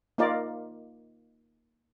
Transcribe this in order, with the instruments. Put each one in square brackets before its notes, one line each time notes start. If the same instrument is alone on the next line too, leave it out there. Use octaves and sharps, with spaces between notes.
[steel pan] A#3 D#4 F4 A#4 D5